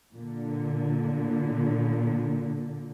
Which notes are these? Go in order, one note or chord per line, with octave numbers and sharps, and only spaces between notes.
A#2 D3